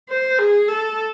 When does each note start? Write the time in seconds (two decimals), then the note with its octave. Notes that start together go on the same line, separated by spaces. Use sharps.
0.09 C5
0.38 G#4
0.68 A4